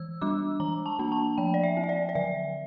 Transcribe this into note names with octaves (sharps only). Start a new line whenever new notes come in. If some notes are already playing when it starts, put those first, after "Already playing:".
Already playing: E3 E6
G3 D4 D6
E3 A#5
A5
A#3 D4
A5
F3 G5
D5
E5
C4
E5
D5
D5
D3 E5